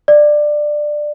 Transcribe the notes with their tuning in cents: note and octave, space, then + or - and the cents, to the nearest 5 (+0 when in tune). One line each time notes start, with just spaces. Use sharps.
D5 +15